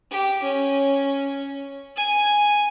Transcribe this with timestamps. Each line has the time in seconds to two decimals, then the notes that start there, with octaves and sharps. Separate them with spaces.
0.11 G4
0.43 C#4
1.97 G#5